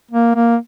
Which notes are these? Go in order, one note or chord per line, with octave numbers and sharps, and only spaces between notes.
A#3
A#3